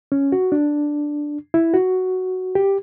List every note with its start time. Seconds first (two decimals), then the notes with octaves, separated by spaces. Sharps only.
0.12 C#4
0.32 F#4
0.52 D4
1.54 E4
1.74 F#4
2.55 G4